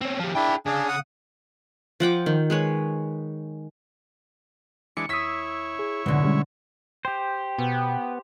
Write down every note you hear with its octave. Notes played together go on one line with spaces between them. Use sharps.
C4 C#4
F3 G3
D4 E4 G#4 G5
C#3 D4 G#4 F5
F#5 D#6
F3 F#5 G5 D6
D#3
G#3 B4 C#5
E3 G#3 D4 C#7
D#2 E4 C#5 D#6 E6 B6
G#4
C2 F2 G#2 B2 D3
G3 G#3 C#4
G4 C5 G5
B2 B3